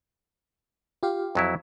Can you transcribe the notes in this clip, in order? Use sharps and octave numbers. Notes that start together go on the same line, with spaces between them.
F4 G4 F5
F2 F#3 E4